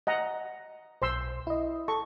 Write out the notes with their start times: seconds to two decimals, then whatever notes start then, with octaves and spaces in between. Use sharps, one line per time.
0.07 D#5 F#5 A#5
1.02 B1 C5 C6 E6
1.47 E4 D#5
1.88 A4 C#6